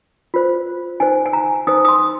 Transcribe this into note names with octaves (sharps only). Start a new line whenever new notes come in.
F4 C5
D#4 C5 G#5
G#5
A#5
D#4 C5 D#6
D#6
C6